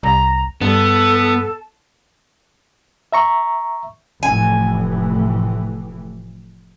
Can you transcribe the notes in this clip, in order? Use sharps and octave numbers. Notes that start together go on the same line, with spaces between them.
C2 A#5
G2 B3 A4 A5
E5 A#5 C#6
F1 A2 E3 G#5